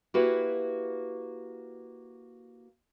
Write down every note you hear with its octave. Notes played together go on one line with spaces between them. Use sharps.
A#3 E4 F#4 G4 B4